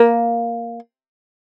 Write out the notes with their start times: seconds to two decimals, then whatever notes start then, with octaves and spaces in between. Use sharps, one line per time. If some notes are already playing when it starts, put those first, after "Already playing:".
Already playing: A#3